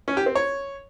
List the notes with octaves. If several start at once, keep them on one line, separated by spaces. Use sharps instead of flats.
C#4
G4
C4
C#5